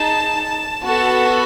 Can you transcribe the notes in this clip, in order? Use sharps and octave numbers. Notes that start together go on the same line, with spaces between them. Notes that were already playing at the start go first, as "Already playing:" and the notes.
Already playing: D#4 G#4 A5
B3 F#4 A4 A5